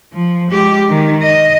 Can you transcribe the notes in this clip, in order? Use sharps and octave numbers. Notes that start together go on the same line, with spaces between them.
F3
G#3 G4
D#3
D#5